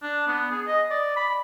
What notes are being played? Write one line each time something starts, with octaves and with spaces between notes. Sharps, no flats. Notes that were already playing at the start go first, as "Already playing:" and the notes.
D4
B3
G#4
D#5
D5
B5